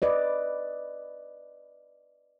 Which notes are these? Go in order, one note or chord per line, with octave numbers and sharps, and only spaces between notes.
B4 D5 D#5